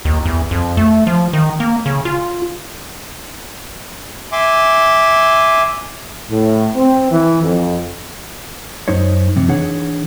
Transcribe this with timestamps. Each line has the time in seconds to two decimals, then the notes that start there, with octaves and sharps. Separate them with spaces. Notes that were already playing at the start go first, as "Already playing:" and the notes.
0.05 D#2
0.26 E2
0.51 F2
0.77 A3
1.07 F3
1.33 D#3
1.60 A#3
1.86 C#3
2.05 F4
4.32 E5 G#5 C6 D6
6.30 A2
6.75 C4
7.10 E3
7.42 F2
8.88 F#2 D#4 C5 C#5
9.36 F2 C3
9.48 E3 D4 D#4 G#4 C#5 F#5